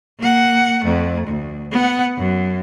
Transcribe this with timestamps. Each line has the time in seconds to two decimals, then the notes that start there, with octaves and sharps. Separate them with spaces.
0.19 A#3 F#5
0.82 F2 A3
1.27 D2
1.72 B3 F#5
2.18 F#2